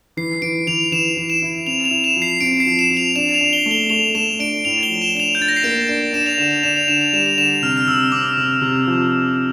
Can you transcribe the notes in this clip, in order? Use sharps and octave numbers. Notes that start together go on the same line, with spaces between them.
E3 C7
E3 D7
E3 F7
E3 E7
E3
E7
E4
C4 F7
F7
E4
E7
F3
C7
C4 D7
C7
F3
E7
F3
F7
D4 E7
E7
F7
D4
G7
A3
G7
A3 F7
A3 E7
D4 D7
A2 F7
G7
F3
E7
D4 E7
F7
G6
D4 A6
A#6
C7
A#3 D7
D4 D7
D4 E7
F7
D3 E7
F7
D4 E7
F7
D3 E7
F7
G3 E7
F7
D3 E7
C3 F6
F6
C3 E6
C4 D6
C3
C3
F3